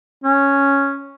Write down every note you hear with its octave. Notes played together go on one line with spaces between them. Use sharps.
C#4